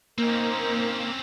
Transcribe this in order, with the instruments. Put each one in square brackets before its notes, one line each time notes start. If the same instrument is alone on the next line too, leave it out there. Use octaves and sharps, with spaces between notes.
[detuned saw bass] A#3 [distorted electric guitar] C4 C#4 [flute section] D#4 A#4 C5